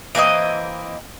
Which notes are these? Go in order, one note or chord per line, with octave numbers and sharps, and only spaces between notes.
E3 A#3 C4 D#5